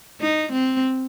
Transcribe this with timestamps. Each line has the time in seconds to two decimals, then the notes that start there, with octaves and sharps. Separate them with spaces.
0.21 D#4
0.53 C4